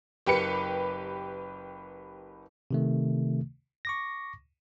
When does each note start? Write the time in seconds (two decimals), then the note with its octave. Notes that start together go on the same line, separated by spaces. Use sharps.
0.27 F#1 G4 B4 C#7
2.71 C3 D#3 A3
3.85 C#6 D6 A#6